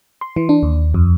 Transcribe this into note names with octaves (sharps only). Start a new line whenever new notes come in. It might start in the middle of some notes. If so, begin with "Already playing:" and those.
C6
E3
D4
D#2
F2